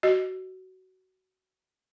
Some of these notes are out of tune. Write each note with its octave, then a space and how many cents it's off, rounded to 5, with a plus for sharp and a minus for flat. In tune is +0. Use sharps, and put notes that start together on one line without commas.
F#4 +20 D#5 +0